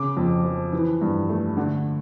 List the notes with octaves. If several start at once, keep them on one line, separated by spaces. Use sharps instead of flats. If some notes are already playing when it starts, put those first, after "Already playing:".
Already playing: C#3 D6
F2
F3
E3
G2
A3
D3